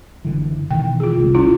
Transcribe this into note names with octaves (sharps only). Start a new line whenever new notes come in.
F#1 D3 E3
B2 D#3 E3 G5
F4 G#4
F1 C2 C3
C#4 E4 F4